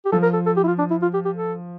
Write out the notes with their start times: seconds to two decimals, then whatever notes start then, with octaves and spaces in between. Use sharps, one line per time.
0.05 G4
0.12 F3 A4
0.23 A#4
0.34 A4
0.46 A4
0.57 G4
0.64 E4
0.68 F4
0.79 D4
0.90 E4
1.02 F4
1.14 G4
1.25 G4
1.36 A4